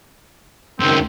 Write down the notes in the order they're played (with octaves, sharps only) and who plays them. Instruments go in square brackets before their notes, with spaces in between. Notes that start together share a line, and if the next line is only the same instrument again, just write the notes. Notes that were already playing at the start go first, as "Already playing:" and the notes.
[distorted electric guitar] C#2 [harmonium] F#2 D#3 [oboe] C4